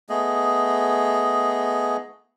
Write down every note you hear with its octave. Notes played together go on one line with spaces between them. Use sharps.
A3 B3 G#4 D#5